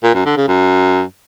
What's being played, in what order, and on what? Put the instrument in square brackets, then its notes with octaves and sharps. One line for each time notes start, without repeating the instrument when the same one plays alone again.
[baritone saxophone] A#2
F#2
D3
C#3
F#2